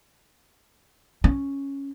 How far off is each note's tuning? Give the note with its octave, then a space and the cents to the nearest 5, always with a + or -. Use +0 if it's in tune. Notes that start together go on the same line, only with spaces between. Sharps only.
C#4 -5